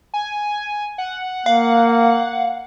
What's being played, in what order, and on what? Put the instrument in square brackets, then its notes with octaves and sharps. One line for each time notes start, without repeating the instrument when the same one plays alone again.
[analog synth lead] G#5
F#5
[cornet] A#3 [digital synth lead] F5